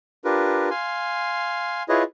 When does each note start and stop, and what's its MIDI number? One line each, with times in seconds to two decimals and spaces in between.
0.25 0.69 62
0.25 0.69 65
0.25 0.69 67
0.25 0.69 70
0.25 0.69 71
0.71 1.83 77
0.71 1.83 80
0.71 1.83 84
1.89 2.03 64
1.89 2.03 65
1.89 2.03 68
1.89 2.03 71
1.89 2.03 73
1.89 2.03 75